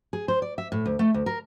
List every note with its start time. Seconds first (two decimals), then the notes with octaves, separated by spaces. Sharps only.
0.13 G#4
0.28 C5
0.42 D5
0.58 E5
0.72 A2
0.86 D2
0.99 A3
1.14 D2
1.26 A#4